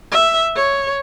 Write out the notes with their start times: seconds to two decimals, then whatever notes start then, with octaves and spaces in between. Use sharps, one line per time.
0.12 E5
0.55 C#5